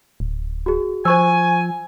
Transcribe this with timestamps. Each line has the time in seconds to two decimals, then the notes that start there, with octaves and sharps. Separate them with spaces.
0.20 D1
0.66 F#4 G#4
1.05 F3 C5 G#5 C#6 E6